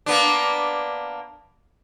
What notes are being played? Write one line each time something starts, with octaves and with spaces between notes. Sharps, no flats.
A#3 B3 D4